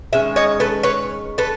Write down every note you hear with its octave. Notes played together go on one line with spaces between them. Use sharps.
D#3 G#3 C#4 E5
C#5 D#5
A4 B4
B4 C#5
A4 B4